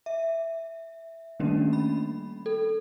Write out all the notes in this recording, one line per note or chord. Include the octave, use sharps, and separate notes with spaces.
E5
D#3 G3 A3 A#3 C#4 D4
B5
A4